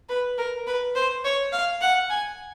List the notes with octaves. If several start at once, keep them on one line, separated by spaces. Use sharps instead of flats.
B4
A#4
B4
C5
C#5
F5
F#5
G#5